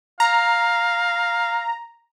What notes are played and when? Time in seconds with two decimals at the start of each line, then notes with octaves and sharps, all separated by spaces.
0.20 F5 A#5